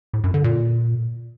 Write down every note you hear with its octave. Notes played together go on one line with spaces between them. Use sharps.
A2
F#2
D3
A#2